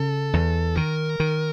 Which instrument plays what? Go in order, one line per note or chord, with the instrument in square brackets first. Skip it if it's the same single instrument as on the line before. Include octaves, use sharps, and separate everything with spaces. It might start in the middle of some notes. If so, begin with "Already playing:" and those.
Already playing: [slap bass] C#3 [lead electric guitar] A4
[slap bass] E2
[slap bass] D#3 [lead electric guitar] A#4
[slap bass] D#3